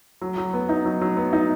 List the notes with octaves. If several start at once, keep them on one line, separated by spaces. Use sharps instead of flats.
F#3
F#3
B3
D#4
F#3
F#3
B3
D#4